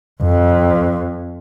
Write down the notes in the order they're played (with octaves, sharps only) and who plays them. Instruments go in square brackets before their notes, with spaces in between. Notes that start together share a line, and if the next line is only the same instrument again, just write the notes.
[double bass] F2